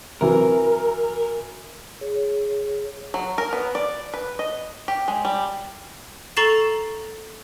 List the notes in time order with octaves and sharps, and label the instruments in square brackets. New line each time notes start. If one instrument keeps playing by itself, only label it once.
[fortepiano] C3 E3 F#3 [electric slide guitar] A#4
[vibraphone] G#4 C#5
[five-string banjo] F#3
A#4
B3
D5
B4
D#5
G4
G#3
G3
[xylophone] A4 A#5 C#6 A6 C7 E7